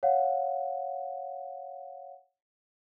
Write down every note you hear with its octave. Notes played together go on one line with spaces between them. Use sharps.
C#5 F5 F#5